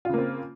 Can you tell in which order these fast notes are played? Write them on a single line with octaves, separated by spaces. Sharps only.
F4 C#3 A#3 C4